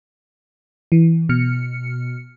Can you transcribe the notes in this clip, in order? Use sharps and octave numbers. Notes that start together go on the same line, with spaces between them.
E3
B2 F6 C#7